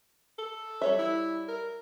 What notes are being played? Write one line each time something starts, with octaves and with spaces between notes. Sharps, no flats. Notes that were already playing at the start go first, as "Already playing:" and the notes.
A4
G3 C#5 E5
E4
A#4